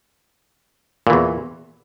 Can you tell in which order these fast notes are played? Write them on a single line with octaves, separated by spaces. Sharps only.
A#2 E3 E2